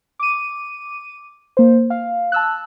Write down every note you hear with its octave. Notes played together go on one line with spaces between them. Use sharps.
D6 D#7
A#3 C5
F5
A5 E6 F#6